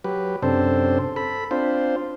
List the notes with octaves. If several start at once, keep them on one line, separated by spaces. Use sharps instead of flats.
F#3 G4 B4
F#2 C3 C4 D4 A4 C5
A4 B5
C4 D4 F4 C5